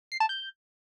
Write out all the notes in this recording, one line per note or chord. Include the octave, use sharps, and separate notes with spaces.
C7
A5
G6